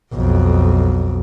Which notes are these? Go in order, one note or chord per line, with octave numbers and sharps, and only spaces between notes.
B1 F2